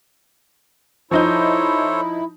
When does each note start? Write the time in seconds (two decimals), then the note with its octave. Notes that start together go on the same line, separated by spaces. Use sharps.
1.11 F3 D#4 E4 A4 C5 C#5 G6